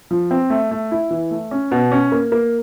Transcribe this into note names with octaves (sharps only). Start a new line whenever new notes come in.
F3
C4
A3
A3
E4
E3
A3
C#4
B2
C#4
A#3
A#3